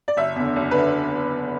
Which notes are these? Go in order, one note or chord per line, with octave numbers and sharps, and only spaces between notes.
D5
F#1 E5
E2 D3
F#1
D3 B4